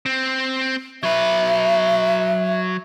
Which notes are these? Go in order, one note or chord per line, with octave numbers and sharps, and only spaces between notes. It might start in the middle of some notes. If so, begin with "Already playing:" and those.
C4
F#3 B4 E5